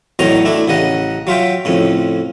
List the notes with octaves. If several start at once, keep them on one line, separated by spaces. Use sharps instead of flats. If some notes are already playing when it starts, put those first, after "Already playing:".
E2 A2 F#3 D#4 C#5 A#5
A3 D4 E4
A1 C#3 D#5 F#5
F#3 F4 E5 G5
F2 A2 C#3